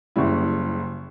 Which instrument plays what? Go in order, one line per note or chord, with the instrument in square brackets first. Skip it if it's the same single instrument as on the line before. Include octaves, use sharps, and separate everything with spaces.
[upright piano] F#1 C#3 G3 E4